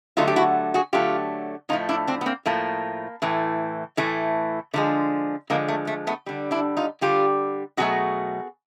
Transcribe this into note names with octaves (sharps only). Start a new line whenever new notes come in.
D3 F#3 A3 D#4 F4
G4
E4 F#4
F#4 G#4
D3 F#3 A3 F4 G4
A2 F3 A3 D#4 F4
D4 E4
C4 D4
B3
A#3 C4
A2 F3 A3 A#3
A2 E3 A3
A2 E3 A3
D3 F3 G#3 A3
D3 F3 G#3 A#3
A3
A3
A3 B3
D3 G3
D4 E4
D#4 F4
D3 G3 F4 G4
B2 F#3 A3 F#4 G#4